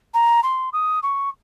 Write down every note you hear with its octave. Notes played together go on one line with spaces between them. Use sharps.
A#5
C6
D#6
C#6